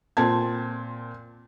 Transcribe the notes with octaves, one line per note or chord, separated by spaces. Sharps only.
A#2 C4 A5 G#6